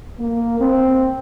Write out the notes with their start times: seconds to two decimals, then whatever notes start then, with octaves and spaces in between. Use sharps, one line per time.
0.18 A#3
0.59 C4